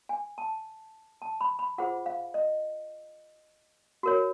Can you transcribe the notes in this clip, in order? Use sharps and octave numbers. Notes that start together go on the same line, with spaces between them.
G#5
A5
A5
B5
B5
F4 G#4 C5 F#5
F5
D#5
F#4 A#4 C#5